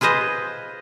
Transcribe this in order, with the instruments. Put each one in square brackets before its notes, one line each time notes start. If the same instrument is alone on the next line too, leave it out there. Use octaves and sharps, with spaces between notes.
[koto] F4 G#4 B4 C5 D#5